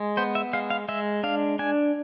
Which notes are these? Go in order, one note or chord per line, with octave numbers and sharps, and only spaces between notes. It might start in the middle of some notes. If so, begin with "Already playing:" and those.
Already playing: G#3
B3 C5
E5
G#3 F5
F5
G#3 E5
D4 F5
D4 G#5